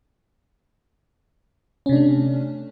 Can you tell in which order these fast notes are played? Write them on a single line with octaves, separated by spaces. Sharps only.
C#4 C3 D4 A3